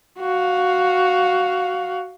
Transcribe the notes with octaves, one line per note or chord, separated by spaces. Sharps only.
F#4 F5